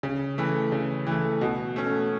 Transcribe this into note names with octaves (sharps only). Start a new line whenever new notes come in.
C#3
E3 A3
C#3
E3 A3
B2
A3 C#4